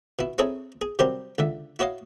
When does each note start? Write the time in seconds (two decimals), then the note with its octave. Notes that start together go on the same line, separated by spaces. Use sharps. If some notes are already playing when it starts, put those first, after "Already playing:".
0.19 B2 E4
0.38 C4 D#4 E4 G#4 A4 C#5
0.81 G#4
0.99 C3 F#3 G3 G4 A#4 C5
1.38 C#2 D3 E5
1.79 E4 F#4 C#5 D#5 F5